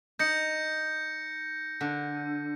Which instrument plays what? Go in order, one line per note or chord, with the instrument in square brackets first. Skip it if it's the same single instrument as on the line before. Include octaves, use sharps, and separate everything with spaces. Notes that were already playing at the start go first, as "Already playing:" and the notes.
[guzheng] D#4 [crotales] G6 A#6 C#7
[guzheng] D3